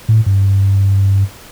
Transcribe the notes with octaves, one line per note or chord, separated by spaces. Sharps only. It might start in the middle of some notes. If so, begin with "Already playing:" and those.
A2
G2